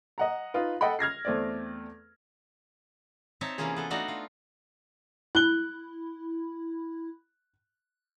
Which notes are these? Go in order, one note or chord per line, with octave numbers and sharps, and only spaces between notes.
D#5 F#5 A#5
D#4 F4 B4
A4 D#5 F#5 G5 B5
F6 G#6 A#6 C7
E2 A3 C4 D5
C4 D#4 C#5 E5 A5
C3 E3 A#3 C#4 F4 G#4
B3 A4
A3 D4 D#4 F#4 F5 F#5
F4
E4 F#6 G7